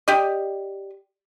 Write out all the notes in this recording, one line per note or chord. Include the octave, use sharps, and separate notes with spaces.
G4 D5 D#5